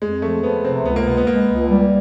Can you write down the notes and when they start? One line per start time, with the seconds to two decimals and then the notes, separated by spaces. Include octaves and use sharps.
0.02 F2 G#3
0.22 F3 A3
0.43 F3 B3
0.65 C3 C4
0.85 C#2 B3
0.96 A#3
1.06 G#3 B3
1.17 B3
1.27 G#3 A#3
1.49 C#2
1.69 G3